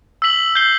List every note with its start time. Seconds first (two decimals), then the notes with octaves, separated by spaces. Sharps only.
0.22 E6 B6 F#7
0.55 G6 C7 G7